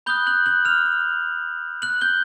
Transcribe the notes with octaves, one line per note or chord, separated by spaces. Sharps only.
B5 D#6 F#6 G6 G7
F#6 F#7
F#6 F#7
F6 F7
F#6 F#7
G6 G7